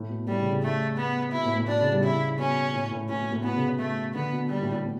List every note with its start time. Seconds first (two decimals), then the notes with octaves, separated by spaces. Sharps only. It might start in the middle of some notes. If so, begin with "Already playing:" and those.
Already playing: A2
0.09 B2
0.27 A2 G3
0.39 C#3
0.50 C#3
0.62 A3
0.97 B3
1.32 B2 E4
1.44 A2
1.56 A2
1.67 B2 D4
1.80 C#3
1.91 G3
2.03 C#3 E4
2.38 B2 C#4
2.74 A2
2.91 A2
3.09 A2 C#4
3.20 B2
3.32 A2
3.44 B2 B3
3.56 C#3
3.67 C#3
3.79 A3
4.14 D3 B3
4.32 B2
4.49 B2 G3
4.61 A2
4.73 A2
4.85 B2